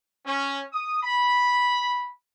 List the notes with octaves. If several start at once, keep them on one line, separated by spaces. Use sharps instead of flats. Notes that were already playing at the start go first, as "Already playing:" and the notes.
C#4
D#6
B5